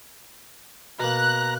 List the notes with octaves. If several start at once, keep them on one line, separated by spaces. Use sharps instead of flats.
B2 A#3 A#5 F#6